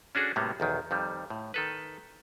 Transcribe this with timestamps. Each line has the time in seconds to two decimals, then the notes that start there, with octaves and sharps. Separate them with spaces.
0.15 C#4 D4 F#4 G#4 A4
0.36 A2 C3 F#3 G3 A#3 B3
0.60 B1 E2 D#3
0.91 F2 D#3 G3
1.30 A2
1.54 D#3 A4 B4